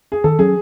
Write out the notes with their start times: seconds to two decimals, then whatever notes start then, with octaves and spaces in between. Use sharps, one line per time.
0.12 G#4
0.24 D#3 A4
0.39 F#3 C#4 G#4